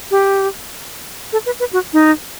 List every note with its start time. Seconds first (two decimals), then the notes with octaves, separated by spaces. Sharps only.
0.11 G4
1.33 A4
1.46 B4
1.60 B4
1.73 F#4
1.93 D#4